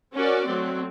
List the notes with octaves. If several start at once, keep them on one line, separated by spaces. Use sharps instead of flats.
C#4 F#4 A#4 D5
F#3 A3 C4